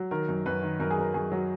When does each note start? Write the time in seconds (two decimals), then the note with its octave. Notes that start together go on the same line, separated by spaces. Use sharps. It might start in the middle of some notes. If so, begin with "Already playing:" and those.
Already playing: F#3
0.11 D#3 A#4
0.29 F#2
0.46 F#2 B4
0.63 D#3
0.80 F#2 A#4
0.91 G#4
0.98 F#2 A#4
1.14 F#2 G#4
1.32 F#3